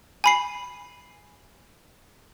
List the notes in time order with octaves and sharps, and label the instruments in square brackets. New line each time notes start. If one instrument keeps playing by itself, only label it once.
[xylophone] G#5 B5 C7